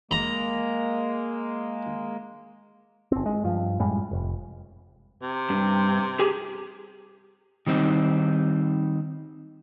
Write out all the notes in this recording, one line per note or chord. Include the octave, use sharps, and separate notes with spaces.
G#3 A#3 A#5
G1 C4
G#3
G2 F3
F#2 A2 G3 G#3
F1
C3
G2
G4 G#4
D#3 G3 C4 D#4